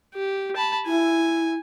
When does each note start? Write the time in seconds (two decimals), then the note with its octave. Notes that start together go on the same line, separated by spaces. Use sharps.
0.14 G4
0.57 A5 B5
0.87 E4 G#5